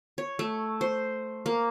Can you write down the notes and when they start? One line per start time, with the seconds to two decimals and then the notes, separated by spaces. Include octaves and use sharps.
0.18 C#5
0.39 A3
0.81 C5
1.46 A#3